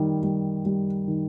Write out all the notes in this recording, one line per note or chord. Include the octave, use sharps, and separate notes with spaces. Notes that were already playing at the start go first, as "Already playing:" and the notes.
Already playing: D#3 G3
G3
G3
D#3